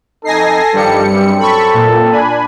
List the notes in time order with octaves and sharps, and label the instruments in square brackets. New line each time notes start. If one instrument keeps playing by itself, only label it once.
[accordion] F2 D#4 [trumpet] A4 [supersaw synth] G#5 A#6 C7
[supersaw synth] G2 G3 C#7 [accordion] D#3 F3
[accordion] F#2 C4
[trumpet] A4 [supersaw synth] B5 C#6
[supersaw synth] A#2
[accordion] D4 G#5 B5